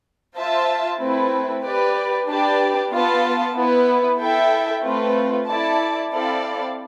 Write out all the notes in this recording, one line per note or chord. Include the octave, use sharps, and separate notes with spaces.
F4 C5 E5 A5
A3 C4 E4 B4
G4 B4 D5
D4 G4 B4 D5 A5
B3 F4 B4 F5 A5
B3 E4 B4
E4 A4 E5 G5
A3 C4 F4 B4
E4 A4 D5 A5
C4 E4 A4 D5 F5